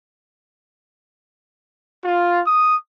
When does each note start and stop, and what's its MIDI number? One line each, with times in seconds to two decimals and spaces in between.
2.04 2.40 65
2.46 2.76 87